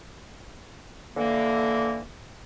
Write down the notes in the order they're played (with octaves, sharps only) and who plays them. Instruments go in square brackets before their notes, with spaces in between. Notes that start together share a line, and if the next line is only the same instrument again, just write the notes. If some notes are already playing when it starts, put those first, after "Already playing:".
[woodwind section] D3 E3 A#3